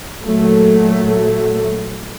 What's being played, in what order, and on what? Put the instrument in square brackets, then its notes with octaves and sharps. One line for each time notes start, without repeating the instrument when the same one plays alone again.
[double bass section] A#2 F#3 A3